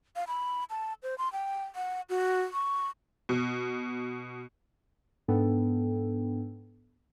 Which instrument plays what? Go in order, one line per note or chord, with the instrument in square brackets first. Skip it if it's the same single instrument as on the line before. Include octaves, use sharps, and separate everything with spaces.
[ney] F5
B5
A5
C5
C6
G5
F#5
F#4
C#6
[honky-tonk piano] B2
[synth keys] G#2 B3 D4 A4 G5